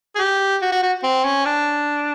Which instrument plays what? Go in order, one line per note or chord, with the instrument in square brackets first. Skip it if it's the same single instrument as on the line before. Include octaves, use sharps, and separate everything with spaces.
[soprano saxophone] G#4
G4
F#4
F#4
F#4
C4
C#4
D4